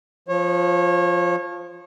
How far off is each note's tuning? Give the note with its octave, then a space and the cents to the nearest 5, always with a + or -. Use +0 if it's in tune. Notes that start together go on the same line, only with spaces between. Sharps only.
F3 +0 C#5 -30